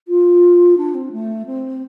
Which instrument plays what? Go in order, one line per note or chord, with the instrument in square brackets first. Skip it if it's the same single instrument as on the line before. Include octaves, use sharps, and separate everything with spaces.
[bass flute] F4
D4
C4
A3
C4